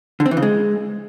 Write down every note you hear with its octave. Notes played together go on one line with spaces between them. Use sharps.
D3
C4
E3
C#3
G#3